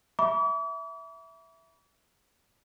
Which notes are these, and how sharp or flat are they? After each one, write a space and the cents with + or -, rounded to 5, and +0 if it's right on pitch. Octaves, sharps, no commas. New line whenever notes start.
E5 +0 B5 -40 D6 -45